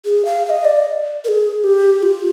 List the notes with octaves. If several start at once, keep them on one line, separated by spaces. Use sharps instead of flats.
G#4
F5
F5
D#5
D5
A#4
G#4
G4
F4